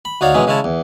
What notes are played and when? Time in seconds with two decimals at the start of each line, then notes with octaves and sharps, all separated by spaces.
0.05 B5
0.21 D2 D#4 F#4 C#5 D5 F5
0.34 B2 E3 G#3 C4 C#4 D#4
0.47 C#3 G#3 C#4 E4 C#5 A5
0.64 E2